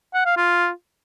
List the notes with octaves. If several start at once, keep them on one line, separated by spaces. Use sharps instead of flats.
F#5
F5
F4